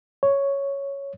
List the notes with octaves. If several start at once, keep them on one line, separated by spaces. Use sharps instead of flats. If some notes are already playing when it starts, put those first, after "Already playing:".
C#5